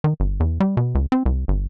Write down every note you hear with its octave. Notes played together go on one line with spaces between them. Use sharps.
D#3
G1
E2
G3
B2
C#2
C4
C2
G1